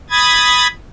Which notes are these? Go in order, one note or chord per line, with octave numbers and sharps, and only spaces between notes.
B5 D#6 G#6 A6